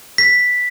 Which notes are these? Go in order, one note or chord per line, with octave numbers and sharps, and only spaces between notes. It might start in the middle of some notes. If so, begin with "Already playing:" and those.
B6